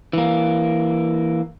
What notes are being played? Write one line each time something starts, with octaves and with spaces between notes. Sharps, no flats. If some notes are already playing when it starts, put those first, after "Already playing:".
E3 A#3